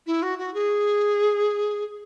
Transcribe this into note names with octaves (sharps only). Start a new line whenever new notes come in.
E4
F#4
F#4
G#4